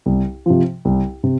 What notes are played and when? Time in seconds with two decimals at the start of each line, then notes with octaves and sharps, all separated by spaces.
0.06 C2
0.46 C3 F3
0.85 C2
1.23 C3